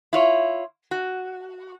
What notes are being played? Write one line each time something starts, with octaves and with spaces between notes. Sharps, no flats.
E4 F4 C#5
F#4